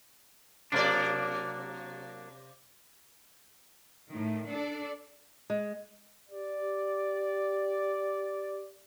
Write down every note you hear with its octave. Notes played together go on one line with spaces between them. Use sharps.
C3 F#3 A#3 D4 D5
A2 D#3
D4 A4 D5
G#3
G4 D5